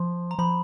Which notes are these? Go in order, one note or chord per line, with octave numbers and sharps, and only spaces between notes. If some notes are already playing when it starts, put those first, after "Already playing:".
Already playing: F3 C6
A#5
F3 B5